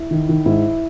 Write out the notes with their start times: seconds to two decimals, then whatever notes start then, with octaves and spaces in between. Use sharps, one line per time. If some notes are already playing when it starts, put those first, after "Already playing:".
Already playing: E4
0.11 D#3
0.29 D#3
0.46 G#2 E4